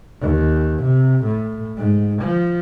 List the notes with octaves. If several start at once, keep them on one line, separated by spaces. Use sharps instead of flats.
D#2
C3
A2
G#2
F3